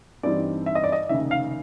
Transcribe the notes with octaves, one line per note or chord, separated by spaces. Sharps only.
G2 E3 G3 C4 D#4 D5
E5
D#5
D5
D#5
F1 D#2 C#3 E5
F5